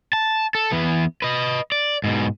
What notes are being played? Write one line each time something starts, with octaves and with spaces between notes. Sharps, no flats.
A5
A4
E3 B3
B4 D#5
D5
G#2 B2